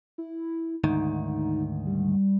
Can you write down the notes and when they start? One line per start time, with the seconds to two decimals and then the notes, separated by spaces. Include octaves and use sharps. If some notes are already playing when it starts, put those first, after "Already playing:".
0.18 E4
0.84 D2 G#2 D#3 D#4
1.86 G3